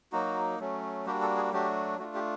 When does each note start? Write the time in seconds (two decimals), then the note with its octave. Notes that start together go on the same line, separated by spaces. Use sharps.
0.12 F#3 A#3 D#4 F#4
0.59 F#3 A3 C#4
1.06 G3 A#3 D4 F#4 G4
1.21 A4
1.36 G#4
1.53 F#3 A3 D4 F#4 G4
1.99 A3 D4 F4 F#4
2.15 G4